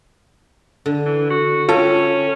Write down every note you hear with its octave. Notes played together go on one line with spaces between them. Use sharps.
D3
E3
F#4
C#4 F4 A4 G5